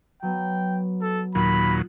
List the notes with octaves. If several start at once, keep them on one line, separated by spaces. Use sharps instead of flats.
F#3 B3 G5
A4
D#2 A#2 F#3 F4 B5